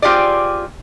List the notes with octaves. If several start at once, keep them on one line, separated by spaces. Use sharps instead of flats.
C4 F4 G4 G#4 D5